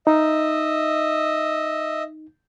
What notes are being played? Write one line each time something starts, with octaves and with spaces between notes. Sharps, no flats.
D#4 D#5 E5